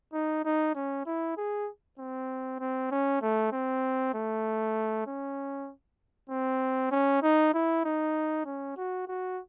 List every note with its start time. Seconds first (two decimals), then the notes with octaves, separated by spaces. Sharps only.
0.13 D#4
0.45 D#4
0.75 C#4
1.06 E4
1.37 G#4
1.98 C4
2.60 C4
2.91 C#4
3.22 A3
3.52 C4
4.15 A3
5.07 C#4
6.30 C4
6.91 C#4
7.23 D#4
7.54 E4
7.85 D#4
8.46 C#4
8.77 F#4
9.08 F#4